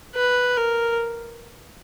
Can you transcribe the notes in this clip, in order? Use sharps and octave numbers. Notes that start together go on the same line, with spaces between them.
B4
A#4